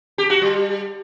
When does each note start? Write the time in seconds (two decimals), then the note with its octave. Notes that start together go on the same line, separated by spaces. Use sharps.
0.18 G4
0.30 F#4
0.41 G3